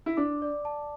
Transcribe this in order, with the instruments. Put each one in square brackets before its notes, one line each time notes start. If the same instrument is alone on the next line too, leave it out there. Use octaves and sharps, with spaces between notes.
[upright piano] E4
[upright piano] D4 [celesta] D6
[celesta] D5
A5